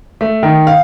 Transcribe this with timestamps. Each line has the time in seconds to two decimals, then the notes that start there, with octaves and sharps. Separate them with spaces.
0.21 A3
0.43 D#3
0.67 F5